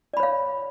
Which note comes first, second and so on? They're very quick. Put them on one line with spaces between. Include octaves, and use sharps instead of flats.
D5 B5 C#5 F5